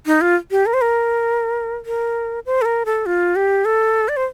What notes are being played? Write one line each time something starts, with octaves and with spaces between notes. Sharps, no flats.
D#4
F4
G4
A#4
C5
A#4
A#4
C5
A4
A#4
A4
F4
G4
A4
D5
C5